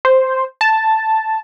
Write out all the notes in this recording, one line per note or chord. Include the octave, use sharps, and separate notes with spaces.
C5
A5